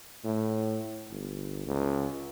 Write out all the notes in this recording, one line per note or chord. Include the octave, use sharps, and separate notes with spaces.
A2
G1
C#2